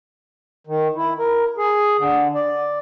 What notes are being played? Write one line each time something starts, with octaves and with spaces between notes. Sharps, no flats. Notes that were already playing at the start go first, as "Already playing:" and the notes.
D#3
E4
A#4
G#4
D3
D5